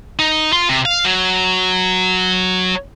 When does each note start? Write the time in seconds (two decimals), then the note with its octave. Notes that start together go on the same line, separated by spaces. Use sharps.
0.19 D#4
0.53 F4 C6
0.69 C3
0.85 F5
1.05 F#3